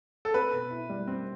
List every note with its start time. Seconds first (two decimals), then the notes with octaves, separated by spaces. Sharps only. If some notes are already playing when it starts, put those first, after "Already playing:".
0.25 A4
0.34 C4 B4
0.53 B2
0.71 E4
0.89 G3
1.07 C4